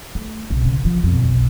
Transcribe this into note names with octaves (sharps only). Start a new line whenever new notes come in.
A3
B1 C#3
C#3
F3
F2 B2
F1 B1